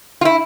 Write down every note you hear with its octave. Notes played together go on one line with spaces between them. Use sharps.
F4
E4